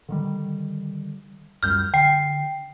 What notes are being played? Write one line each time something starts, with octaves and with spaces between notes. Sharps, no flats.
D3 D#3 G3
C#2 F#2 G3 F6 G6
D3 G5 C7